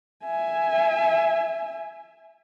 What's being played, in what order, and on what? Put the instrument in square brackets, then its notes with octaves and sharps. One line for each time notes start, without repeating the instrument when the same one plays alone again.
[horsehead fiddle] E5 G#5